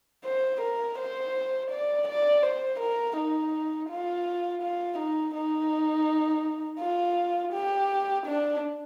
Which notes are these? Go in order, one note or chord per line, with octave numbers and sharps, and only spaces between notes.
C5
A#4
C5
D5
D5
C5
A#4
D#4
F4
F4
D#4
D#4
F4
G4
D4